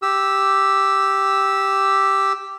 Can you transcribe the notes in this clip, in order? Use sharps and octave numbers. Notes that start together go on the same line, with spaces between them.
G4 E6